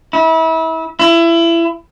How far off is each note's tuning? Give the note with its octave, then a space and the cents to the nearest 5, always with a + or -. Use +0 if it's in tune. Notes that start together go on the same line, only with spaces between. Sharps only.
E4 -30
E4 +25